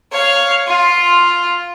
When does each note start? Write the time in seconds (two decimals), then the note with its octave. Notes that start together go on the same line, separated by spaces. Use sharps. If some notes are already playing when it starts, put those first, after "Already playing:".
0.12 C#5 F5
0.67 F4